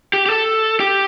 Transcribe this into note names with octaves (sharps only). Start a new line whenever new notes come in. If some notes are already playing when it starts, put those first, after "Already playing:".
G4
G4
A4
G4